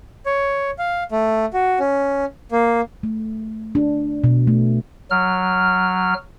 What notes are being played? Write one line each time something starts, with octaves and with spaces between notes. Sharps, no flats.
C#5
F5
A3
F#4
C#4
A#3
A3
D4
B2
A3
F#3 F6